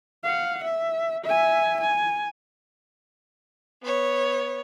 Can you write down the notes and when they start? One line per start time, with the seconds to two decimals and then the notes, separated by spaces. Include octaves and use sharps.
0.24 F5 F#5
0.64 E5
1.25 E5 G#5
1.80 G#5
3.83 B3 C#5